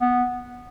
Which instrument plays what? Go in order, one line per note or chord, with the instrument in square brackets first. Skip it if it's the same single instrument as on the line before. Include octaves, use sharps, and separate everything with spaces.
[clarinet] B3